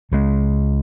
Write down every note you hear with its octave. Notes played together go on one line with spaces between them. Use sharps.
C#2 C#3 G#3